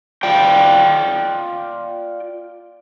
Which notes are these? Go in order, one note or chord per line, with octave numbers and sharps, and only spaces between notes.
F4 D5 G5